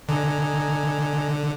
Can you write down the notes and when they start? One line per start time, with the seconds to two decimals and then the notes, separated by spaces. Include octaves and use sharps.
0.09 D3 D#5 G#5 A#5